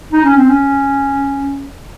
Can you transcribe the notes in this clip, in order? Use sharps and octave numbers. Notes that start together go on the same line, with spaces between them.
D#4
C#4
C4
C#4